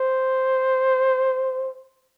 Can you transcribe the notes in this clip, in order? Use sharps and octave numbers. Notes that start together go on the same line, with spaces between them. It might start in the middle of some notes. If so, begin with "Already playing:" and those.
Already playing: C5